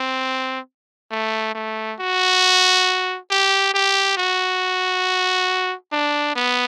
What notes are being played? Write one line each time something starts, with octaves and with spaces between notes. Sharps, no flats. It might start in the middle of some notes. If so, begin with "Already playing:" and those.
Already playing: C4
A3
A3
F#4
G4
G4
F#4
D4
B3